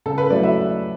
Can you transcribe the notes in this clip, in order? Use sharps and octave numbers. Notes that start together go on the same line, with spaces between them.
C#3 A4
B4
F#3 A3 E4 D5
E5